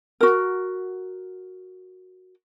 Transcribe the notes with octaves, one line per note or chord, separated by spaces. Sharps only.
F#4 A#4